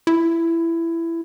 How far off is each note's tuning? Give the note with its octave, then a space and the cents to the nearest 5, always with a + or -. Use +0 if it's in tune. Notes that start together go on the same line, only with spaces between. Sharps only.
E4 +15